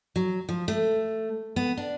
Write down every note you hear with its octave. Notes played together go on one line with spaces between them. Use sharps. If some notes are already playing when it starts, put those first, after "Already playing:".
F#3
F3
A3
B3
D4